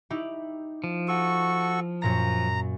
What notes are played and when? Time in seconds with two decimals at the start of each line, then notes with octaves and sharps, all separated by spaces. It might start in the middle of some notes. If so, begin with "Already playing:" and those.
0.10 D#4 E4 G4
0.84 F3
1.08 F#4 A4 C#6
2.02 F#2 A#2 A#5 A#6